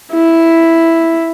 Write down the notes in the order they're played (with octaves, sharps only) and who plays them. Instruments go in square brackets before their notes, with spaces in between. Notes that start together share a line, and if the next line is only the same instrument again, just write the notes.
[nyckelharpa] E4